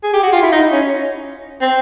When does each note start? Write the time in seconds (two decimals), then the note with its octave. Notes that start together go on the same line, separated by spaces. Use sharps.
0.04 G#4
0.13 G4
0.23 F#4
0.32 F4
0.42 E4
0.52 D#4
0.72 C#4
1.61 C4